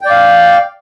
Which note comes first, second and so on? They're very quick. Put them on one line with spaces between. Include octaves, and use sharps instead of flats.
G5 D5 F5